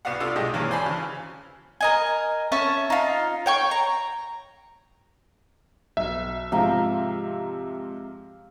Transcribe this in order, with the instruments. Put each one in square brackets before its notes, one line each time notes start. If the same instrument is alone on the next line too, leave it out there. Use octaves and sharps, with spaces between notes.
[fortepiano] C2 B3 F#4 D5 F5 F#5
C3 D4 F4 A4
B1 G2 G#3 G4 D#5
G2 D#3 E3 A#3 C#4
C5 D5 G#5 A5 B5
C#3 E3
[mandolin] A#4 D#5 G#5
C#4 E5 A5 C#6
D#4 F4
C#5 G5 C#6
A#5
[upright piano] B1 [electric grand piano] E5
[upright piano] G#2 C3 F3 [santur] F5 G5 A#5